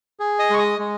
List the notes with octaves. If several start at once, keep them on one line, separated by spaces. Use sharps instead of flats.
G#4
D#5 D#6
G#3 C#6
D#5 D#6
G#3